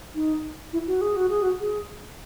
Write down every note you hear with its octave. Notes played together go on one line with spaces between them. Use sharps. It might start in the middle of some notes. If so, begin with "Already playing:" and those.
D#4
E4
F#4
G#4
F#4
G#4
F#4
G#4